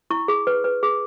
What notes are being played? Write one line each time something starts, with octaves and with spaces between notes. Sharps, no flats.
E4 C#6
G#4
B4
B4
G#4